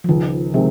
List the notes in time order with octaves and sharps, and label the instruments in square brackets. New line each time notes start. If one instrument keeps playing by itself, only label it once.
[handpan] F3
[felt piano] C#2 [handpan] D#3
[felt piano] C3 D#3 G#3 C4 [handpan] F3